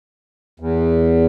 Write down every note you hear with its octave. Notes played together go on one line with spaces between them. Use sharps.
E2